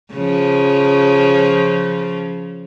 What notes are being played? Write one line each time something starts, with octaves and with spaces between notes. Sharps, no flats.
C#3 F3